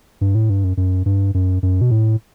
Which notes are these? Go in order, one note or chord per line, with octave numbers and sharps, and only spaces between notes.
G2
A2
G2
F#2
F#2
G2
F#2
F#2
B2
A2